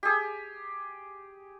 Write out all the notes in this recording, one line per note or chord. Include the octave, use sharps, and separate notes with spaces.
G4 G#4